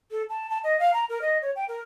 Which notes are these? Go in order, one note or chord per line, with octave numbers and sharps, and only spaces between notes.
A4
A5
A5
D#5
F5
A#5
A#4
D#5
C#5
G5
A#4